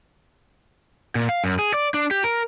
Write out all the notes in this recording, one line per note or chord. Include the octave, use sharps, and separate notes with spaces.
A#2
F5
F#2
G#4
D5
D4
G4
A#4